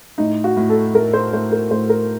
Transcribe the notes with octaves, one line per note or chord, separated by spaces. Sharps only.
A2 D#4
F#4
A2
A4
A2 A#4
C5
A2 C5
A#4
A2 C5
A#4